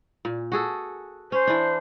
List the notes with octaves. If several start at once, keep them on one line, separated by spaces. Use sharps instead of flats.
A#2
F#4 G#4 A4
C#4 C5
E3 D4